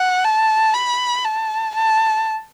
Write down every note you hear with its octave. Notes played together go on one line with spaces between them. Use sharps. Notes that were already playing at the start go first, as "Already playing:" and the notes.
Already playing: F#5
A5
B5
A5
A5